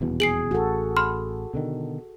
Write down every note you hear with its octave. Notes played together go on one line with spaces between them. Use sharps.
D#1 E2 B2
G#4 C7 D7 F#7
A1 F#4 A4
B5 C6 F6
B2 D3 D#3